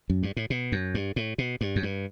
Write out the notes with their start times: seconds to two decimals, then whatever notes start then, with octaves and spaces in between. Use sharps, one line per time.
0.10 F#2
0.23 G2
0.37 A2
0.50 B2
0.72 F#2
0.95 G2
1.16 A2
1.38 B2
1.61 G2
1.76 F#2
1.83 G2